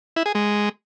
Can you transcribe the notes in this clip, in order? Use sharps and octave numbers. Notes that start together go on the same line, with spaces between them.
E4
G#4
G#3